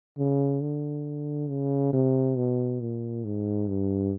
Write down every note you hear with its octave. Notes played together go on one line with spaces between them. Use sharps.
C#3
D3
C#3
C3
B2
A#2
G#2
G2